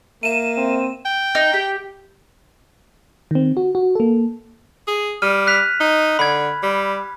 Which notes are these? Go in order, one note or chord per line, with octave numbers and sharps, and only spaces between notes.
A#3 E5 D#7 E7
C4
G5
D#4
G4
D#3 C4
F#4
F#4
A#3 A4
G#4
G3 F6 D#7
F#6 B6 F7
D#4
D3 B5 G#6
G3